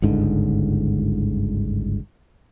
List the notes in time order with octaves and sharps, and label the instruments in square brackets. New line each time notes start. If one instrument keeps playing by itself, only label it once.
[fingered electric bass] G1 C#2 G#2 D3